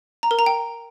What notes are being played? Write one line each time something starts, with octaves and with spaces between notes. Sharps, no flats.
A#5
A#4
A#5
G5